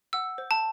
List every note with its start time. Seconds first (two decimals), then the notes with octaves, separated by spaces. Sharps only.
0.13 F#5 E6
0.38 C5
0.51 A5